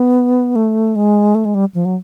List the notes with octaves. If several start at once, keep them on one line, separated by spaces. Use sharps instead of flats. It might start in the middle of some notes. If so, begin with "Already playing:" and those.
Already playing: B3
A3
G#3
A3
G#3
G3
F3
F#3